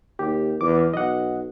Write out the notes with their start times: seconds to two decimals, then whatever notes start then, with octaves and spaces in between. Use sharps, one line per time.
0.19 D#2 G4
0.61 E2 D6
0.94 B1 D#5 F#5